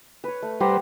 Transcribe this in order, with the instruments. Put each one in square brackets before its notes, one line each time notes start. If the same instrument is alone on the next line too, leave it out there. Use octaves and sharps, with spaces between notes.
[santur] B4 C#5
A3
[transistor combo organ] G3 B4 C5 [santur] G4 F#5 A#5